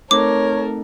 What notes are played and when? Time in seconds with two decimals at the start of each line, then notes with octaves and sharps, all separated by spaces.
0.11 A3 C4 D#4 A4 A#4 C#5 D6